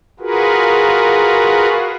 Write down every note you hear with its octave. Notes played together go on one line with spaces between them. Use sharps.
F4 F#4 G#4 A#4 B4